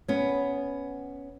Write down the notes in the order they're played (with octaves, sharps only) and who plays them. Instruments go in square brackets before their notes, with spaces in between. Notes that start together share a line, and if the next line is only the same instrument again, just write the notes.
[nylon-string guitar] B3 C#4